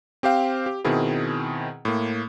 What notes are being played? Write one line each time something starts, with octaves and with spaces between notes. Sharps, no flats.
C4 G4 C5 F5 G5
G4
B2 D#3 C4 E4 G#4
A2 A#3